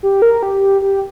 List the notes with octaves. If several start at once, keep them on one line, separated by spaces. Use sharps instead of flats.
G4
A#4
G4
G4